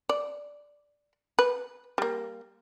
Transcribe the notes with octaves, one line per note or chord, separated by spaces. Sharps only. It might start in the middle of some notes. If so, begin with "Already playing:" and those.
D5
B4
G3 A#3